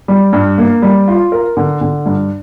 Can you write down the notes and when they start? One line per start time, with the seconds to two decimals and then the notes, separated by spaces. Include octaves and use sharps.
0.08 G3
0.33 G2
0.58 A#3
0.82 G3
1.08 F4
1.32 A#4
1.57 D3
1.81 D3
2.06 G2